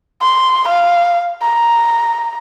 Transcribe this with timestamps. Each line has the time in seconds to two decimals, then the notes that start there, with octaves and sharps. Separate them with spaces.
0.22 C6
0.69 F5
1.42 A#5